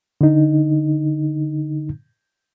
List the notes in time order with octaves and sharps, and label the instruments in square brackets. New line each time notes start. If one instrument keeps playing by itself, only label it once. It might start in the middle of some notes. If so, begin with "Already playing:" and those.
[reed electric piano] D3 D#4